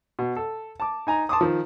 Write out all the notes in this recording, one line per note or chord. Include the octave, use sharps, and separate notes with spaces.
B2
A4
A5 D6
D#4 G#5 A#5
A5 C6 D6 D#6
D#3 F3